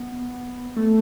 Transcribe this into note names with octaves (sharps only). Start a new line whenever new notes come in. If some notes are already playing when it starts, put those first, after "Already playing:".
Already playing: B3
A3